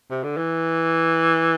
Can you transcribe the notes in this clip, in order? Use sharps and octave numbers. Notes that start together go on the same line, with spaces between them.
C3
D3
E3